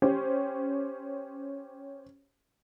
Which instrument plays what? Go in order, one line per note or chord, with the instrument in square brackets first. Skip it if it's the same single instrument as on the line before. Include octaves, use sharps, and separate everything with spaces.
[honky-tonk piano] C#4 G4 C5